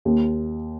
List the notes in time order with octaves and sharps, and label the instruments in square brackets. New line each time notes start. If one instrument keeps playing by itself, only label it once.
[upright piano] D#2